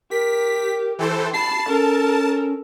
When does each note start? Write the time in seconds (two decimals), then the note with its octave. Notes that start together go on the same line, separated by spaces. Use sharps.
0.11 G4 A#4 B6
0.99 E3 A4 C5 G5
1.34 A5 B5 C7
1.68 C#4 A4 A#4